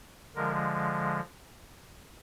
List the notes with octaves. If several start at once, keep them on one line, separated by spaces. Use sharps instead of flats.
D3 F3 G#3 A#4